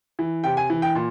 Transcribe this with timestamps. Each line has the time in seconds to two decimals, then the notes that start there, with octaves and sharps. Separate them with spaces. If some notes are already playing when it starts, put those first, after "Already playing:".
0.19 E3
0.44 C3 G5
0.57 G#5
0.70 E3
0.82 G5
0.95 A#2